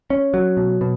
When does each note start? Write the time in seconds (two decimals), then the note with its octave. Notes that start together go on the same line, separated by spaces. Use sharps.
0.10 C#4
0.34 F#3
0.57 B2
0.81 B2